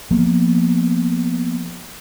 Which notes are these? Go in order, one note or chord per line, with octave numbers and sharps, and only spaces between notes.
F3 A#3 B3